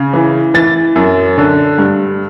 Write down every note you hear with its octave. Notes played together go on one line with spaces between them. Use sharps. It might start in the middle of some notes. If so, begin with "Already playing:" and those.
Already playing: C#3
E3
E3 A6
F#2
D3
G2